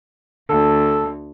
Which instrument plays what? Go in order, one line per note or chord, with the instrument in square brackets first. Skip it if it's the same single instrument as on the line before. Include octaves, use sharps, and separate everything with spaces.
[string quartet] D2 [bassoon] A4